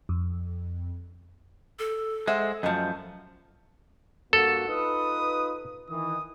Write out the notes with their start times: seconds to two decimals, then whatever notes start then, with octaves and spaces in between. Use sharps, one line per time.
0.09 F2
1.79 A4
2.27 G#3 C5 E5 F#5
2.63 F#2 F3 A3 D#5
4.33 G2 A#3 F#4 A4
4.68 D#4 F4 B4 D#6
5.89 D#3 E3 D#6